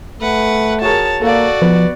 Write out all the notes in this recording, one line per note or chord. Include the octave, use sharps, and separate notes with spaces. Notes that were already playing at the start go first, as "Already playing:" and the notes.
A3 B4 F#5
F#4 G#4 A#4 C#5 A5
A#3 F#4 A4 D5 F5
B2 F3 B3